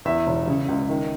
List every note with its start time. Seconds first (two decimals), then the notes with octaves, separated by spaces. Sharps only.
0.05 E2 E5
0.27 E1
0.47 C#3
0.68 C#2
0.89 D#3